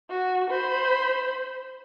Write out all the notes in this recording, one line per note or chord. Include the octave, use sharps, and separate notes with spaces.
F#4
C5 B5